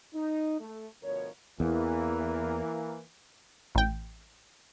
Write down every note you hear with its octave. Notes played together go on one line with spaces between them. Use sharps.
D#4
A3
D2 B2 F3 A#4 C#5
E2 E3 A#3
A1 G5